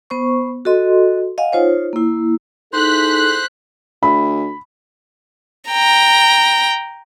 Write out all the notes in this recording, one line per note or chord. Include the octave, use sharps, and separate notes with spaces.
B3 C5 C#6
F#4 A4 D#5 C6
D#5 F5 F#5 G#5
D#4 F4 C5 C#5
A#3 E4
D#4 E4 G#4 A4 C5 C6 F#6 B6
D2 B5
G5 A#5